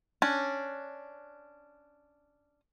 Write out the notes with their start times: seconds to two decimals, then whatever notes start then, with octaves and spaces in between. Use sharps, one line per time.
0.22 C#4 D4